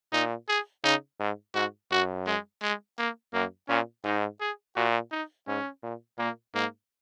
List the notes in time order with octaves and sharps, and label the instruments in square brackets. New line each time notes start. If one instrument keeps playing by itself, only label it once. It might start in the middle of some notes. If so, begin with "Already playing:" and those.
[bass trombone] A#2 [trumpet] D#4
[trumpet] G#4
[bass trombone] C#3 [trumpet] D#4
[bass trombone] G#2
[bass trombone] G#2 [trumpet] F#4
[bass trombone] F#2 [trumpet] F#4
[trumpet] G#3
G#3
A#3
[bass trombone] F#2 [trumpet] A#3
[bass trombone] A#2 [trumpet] C#4
[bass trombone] G#2 [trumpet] D#4
[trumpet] G#4
[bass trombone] A#2 [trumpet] F#4
[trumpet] D#4
[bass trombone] G#2 [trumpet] C#4
[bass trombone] A#2
[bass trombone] A#2 [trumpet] A#3
[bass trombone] G#2 [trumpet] A#3